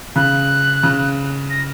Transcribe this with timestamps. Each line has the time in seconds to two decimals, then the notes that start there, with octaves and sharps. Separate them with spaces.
0.16 C#3 F#6
0.83 C#3
1.50 A#6